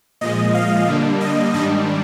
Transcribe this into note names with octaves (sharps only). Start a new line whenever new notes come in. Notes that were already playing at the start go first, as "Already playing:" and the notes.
A#2 F3 G#3 D#5
F5
D3 G3 A#3 D4
D#5
G#2 D#3 G3 D4 D#5